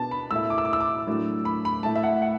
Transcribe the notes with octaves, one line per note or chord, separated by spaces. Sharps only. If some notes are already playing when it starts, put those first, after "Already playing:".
Already playing: B2 B3 D4 A5
B5
A2 A3 E4 E6
D6
E6
D6
E6
D6
A2 F#3 A3 D4
B5
B5
A2 A3 E4 A5
E5
F#5
F#5